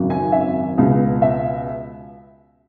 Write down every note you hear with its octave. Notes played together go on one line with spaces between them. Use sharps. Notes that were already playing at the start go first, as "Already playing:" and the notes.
Already playing: G#1 F#2 C#3 F#3
G#5
E5
C#2 B2 G#3
E5